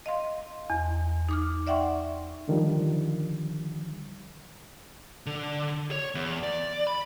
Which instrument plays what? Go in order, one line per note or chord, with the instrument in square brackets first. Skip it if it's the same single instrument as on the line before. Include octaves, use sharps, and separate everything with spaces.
[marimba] D#5 F5 C6
E2
D#4 D6 F6
D5 E5 F#5 G5 C6 C#6
[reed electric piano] D3 D#3 F3 G3
[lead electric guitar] D3
C#5
E2
D5
B5